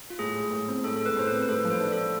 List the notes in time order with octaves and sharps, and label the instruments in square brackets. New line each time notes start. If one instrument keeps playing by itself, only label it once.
[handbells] F4
[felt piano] A2 [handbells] G#4
[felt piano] G#3
A2
C4
[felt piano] A2 [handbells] A4
[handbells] A4
[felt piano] G#3
[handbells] B4
[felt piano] A2 [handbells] C5
[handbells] B4
[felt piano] C4
[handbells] B4
[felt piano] A2 [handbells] A4
[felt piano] F3
[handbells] C5
[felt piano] D4
[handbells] A4
[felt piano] A3